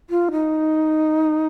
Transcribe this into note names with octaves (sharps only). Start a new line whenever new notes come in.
F4
D#4